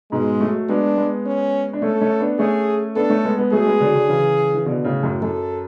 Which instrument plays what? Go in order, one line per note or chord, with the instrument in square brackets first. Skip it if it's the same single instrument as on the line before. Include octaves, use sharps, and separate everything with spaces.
[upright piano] G#2 B2 [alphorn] G#3
[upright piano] F#3 A3
[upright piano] G#3 B3 [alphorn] D4
[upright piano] G#3 B3
[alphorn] C#4
[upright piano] D4
[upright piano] A3 C#4 [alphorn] A4
[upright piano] A3 C#4
B3 D4
[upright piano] A3 C#4 [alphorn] G#4
[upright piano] B3 D4 [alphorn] A4
[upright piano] A3 C#4
G#3 B3
G#3 B3
[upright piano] F#3 A3 [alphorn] G#4
[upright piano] G#3 B3
D3 F#3
D3 F#3
C#3 E3
E3
B2 D3
A2 C#3
F#2 A2
[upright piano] F#2 [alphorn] A4